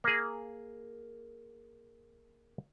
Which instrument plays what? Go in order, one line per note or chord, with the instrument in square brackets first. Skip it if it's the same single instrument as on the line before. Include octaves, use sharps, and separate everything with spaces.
[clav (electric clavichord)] A#3 G#4